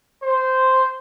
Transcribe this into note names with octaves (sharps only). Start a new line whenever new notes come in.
C5